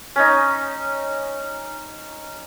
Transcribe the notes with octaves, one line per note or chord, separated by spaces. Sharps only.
C#4 D#4